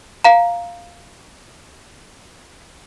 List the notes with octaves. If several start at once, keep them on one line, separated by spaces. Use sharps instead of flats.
F5 A#5